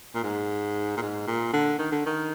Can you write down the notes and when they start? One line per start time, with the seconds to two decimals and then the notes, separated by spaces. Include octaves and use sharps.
0.15 A#2
0.23 G#2
0.97 A#2
1.02 G#2
1.27 A#2
1.53 D3
1.79 D#3
1.92 D3
2.06 D#3